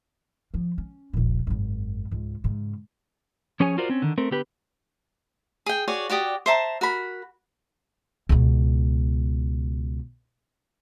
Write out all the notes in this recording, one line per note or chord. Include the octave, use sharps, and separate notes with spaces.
F3
C#4
D#1 A#1
G#1 F#2
C#2 G#2
G#2 C#3
F3 C#4 G#4 C#5 G#5
F4 F#4 A#4 C5 D5
C4 C#4
D3 D#3
A3 C4 A#4
D3 B3 G4 B4
G#4 G5
F#4 G#4 C#5 D5
F#4 G4 D5 D#6
C5 E5 A5 A#5
F#4 A#4 B5
C#2 B2